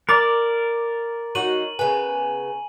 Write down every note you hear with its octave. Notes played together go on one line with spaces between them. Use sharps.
A#4 D5 A#5
F#3 D#4 F#4 D#7 F#7
C#3 B3 G#5